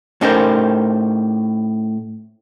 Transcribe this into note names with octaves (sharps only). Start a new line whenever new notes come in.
A2 C#4 D#4 G4 A#4 C5